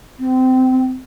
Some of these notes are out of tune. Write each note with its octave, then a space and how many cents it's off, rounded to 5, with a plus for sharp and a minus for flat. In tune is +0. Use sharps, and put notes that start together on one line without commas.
C4 -25